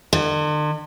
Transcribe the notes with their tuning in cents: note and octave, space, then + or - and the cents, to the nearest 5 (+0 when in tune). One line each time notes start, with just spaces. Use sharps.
D3 +45